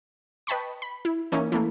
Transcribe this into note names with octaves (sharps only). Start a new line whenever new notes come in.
B4 D#5 G5 A5 B5 C#6
B5
E4
E3 A#3 C#4 D#4 E4
E3 A3 A#3